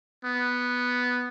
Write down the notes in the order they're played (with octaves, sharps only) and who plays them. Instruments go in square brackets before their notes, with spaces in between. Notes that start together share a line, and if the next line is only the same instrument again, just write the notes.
[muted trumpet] B3